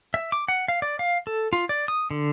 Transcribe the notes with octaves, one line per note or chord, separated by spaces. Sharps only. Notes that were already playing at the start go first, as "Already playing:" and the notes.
E5
D6
F#5
F5
D5
F5
A4
F4
D5
D#6
D3